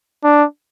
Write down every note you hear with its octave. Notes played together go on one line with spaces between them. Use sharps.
D4